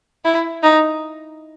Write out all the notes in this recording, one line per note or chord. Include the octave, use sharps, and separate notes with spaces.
E4
D#4